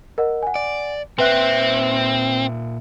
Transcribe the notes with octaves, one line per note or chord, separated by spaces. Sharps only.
A#4 D#5 F#5
F#5 G#5
D5
A#2 C4 B4 E5 F#5 F#6